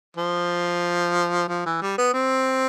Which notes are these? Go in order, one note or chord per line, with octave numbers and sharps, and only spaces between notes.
F3
F3
E3
G3
B3
C4